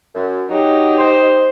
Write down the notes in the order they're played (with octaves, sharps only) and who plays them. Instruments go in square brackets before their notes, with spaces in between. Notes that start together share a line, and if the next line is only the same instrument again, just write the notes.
[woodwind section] F#2
[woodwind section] F#3 [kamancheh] D#4 G4
[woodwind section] C5